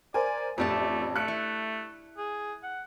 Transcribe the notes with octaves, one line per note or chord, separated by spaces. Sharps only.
A#4 C5 D5 G#5
A1 F2 A3 D4 G4 A5
A3 F#6 C#7
E4
G#4
F#5